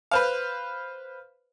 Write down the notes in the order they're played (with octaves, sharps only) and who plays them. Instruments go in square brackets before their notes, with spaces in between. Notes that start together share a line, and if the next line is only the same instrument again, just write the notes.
[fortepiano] B4 C5 F5